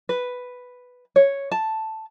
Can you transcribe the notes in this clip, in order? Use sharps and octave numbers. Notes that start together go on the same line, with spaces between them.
B4
C#5
A5